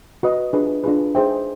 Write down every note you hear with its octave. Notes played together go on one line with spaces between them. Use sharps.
F#4 B4 D#5
D4 F4 G#4 B4
D4 F4 G#4 B4
D#4 G#4 C5 E5 G5